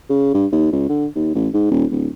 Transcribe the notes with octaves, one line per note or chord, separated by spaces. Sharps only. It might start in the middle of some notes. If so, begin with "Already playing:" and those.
C#3
G2
D#2
C#2
D3
D#2
A1
G#2
D#1
D1